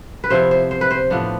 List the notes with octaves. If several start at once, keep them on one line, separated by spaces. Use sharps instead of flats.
B4
C3 F3 B3 E4 C5
C5
C5
B4
C5
A2 F3 B3 D4